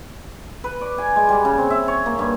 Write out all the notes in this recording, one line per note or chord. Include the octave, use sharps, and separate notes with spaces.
B4
D5
G#5
G#3
G3
C#3
C4
E5
C#5
A#3
G2